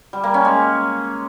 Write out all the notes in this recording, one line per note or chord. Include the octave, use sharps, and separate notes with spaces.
G3
A#3
C#4
G#3